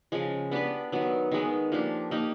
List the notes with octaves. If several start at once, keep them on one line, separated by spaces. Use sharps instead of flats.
C#3 F3 G#3
B3 D4 G4 B4
D#3 F#3 B3
D#3 G#3 B3
F3 A#3 D4 G4
A#3 D#4 G4